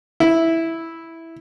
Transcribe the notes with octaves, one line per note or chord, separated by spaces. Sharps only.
E4